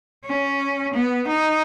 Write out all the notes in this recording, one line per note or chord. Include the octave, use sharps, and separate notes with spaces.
C#4
B3
D#4